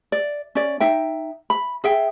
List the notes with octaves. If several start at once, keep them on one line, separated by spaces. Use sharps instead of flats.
D5
C#4 D5
D#4 E5 G5
B5
G#4 E5 G5